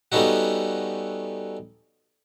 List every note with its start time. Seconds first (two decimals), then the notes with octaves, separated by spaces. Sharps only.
0.12 G3 A3 B3 C#4 D#4 F#4